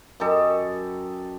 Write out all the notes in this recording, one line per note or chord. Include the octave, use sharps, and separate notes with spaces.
F#2 G4 A4 D#5